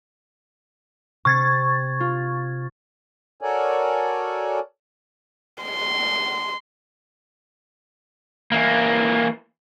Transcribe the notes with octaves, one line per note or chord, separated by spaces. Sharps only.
C3 C#6 G#6 A6
F4
F#4 A4 A#4 C#5 D5 G#5
C6
E3 A#3